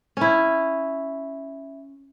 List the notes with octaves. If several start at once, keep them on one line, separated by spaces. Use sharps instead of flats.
C#4 E4